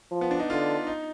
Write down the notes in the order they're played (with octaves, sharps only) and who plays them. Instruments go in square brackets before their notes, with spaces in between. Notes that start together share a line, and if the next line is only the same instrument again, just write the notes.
[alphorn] F3
[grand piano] B3
D4
D#4
[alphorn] D3 [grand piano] F4
[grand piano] D#4